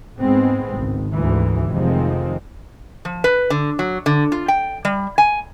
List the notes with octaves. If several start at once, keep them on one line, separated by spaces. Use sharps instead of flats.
G#2 G#3 B3 C4
G#1 C#2
D2 G#2 E3
F1 C3 D#3 F3 G#3 C4
F3
B4
D3
F#3
D3
F4
G5
G3
G#5